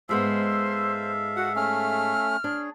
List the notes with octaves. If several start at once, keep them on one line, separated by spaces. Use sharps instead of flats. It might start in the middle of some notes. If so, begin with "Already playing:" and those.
G#2 G#3 B3 A4 C5 E5 F5
F#4 F#5
A3 C#4 F6
D4 G#4 C#5